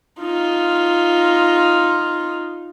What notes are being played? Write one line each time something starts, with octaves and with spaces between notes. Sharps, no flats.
D#4 F4